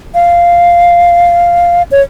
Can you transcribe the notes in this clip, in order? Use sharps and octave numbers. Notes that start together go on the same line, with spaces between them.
F5
C#5